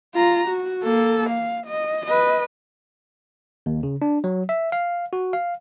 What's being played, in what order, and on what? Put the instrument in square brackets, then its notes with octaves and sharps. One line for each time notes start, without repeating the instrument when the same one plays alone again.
[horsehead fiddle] F4 A#5
F#4
A#3 A4
F5
D#5
B4 D#5
[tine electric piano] D#2
C#3
D4
F#3
E5
F5
F#4
F5